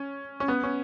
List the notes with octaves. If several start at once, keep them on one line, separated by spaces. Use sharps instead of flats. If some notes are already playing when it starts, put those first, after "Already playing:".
Already playing: C#4
C#4
B3
C#4